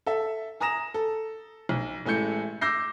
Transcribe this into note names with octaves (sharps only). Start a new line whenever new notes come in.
A4 E5
G#5 A#5 D#6 A#6 E7
A4
B1
A1 G#3 A3 E4 G6 C#7
D6 E6 G6 A#6 C7